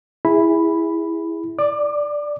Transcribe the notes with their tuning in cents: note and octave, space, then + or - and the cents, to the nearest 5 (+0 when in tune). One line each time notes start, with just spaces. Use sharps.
E4 +0 G#4 -15 B5 +0
D5 +0 D6 +35